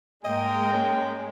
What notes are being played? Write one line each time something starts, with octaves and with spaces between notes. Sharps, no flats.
G#2 G#3 A#3 A#4 D#5 G5
C#4